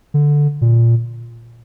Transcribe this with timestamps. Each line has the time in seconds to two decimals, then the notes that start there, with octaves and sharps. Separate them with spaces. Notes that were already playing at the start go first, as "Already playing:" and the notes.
0.14 D3
0.61 A#2